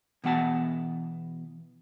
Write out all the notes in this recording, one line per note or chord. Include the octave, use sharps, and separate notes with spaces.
B2 E3 B3 F#5 A5